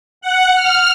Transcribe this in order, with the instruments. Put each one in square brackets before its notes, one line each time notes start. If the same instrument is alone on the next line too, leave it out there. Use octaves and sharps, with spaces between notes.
[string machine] F#5
F6